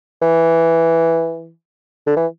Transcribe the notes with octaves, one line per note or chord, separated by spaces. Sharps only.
E3
D3
E3